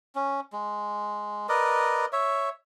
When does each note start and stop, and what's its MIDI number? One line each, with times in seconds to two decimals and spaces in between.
0.15 0.40 61
0.53 1.47 56
1.49 2.06 70
1.49 2.06 71
1.49 2.06 74
1.49 2.06 75
2.13 2.49 73
2.13 2.49 76